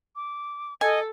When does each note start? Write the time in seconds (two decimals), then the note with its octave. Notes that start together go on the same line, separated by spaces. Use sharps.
0.16 D6
0.81 A4 D#5 G#5